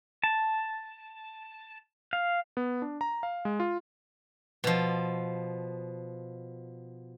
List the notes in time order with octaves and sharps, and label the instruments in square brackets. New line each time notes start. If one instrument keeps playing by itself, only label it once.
[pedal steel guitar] A5
F5
[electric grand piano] B3
D4
A#5
F5
G#3
F4
[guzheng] B2 F3